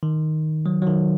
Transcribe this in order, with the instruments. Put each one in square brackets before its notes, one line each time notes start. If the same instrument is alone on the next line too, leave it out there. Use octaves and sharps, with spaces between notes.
[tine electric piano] D#3
F#3
F#3
D#3